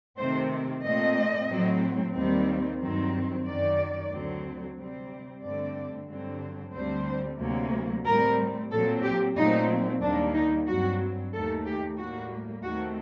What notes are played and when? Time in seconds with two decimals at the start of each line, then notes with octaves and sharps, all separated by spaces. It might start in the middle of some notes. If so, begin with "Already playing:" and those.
0.17 C3 D#3 A3 C4 C5
0.83 A#2 A3 C4 D#5
1.49 A2 F#3 C4
2.14 D#2 D#3 G3 C4
2.80 G2 D#3 F#3 C4
3.45 F#2 D#3 F#3 D5
4.10 D2 D3 F#3 C4
4.77 C3 G3 C4
5.42 G2 D3 A3 C4 D5
6.07 G2 D3 F#3 C4
6.73 D2 D3 G3 C4 C5
7.38 D2 C3 F#3 A#3
8.04 A2 G3 C4 A#4
8.70 A#2 F#3 C4 A4
9.02 G4
9.36 A#2 F#3 A3 C4 D#4
10.01 D#2 D#3 G3 A#3 D4
10.34 D#4
10.66 G2 F#3 C4 F#4
11.33 D#2 D#3 A3 A4
11.66 G4
11.97 A2 G3 A#3 F#4
12.63 D#2 D#3 A3 C4 F#4